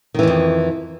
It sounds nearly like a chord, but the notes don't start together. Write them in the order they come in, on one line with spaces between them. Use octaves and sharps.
D#3 E3 G#2 F2